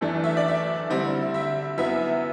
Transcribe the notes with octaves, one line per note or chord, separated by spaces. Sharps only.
F#2 E3 A3 D4
E5
D5
E5
D3 G3 C4 E4
E5
F#2 F#3 B3 E4 E5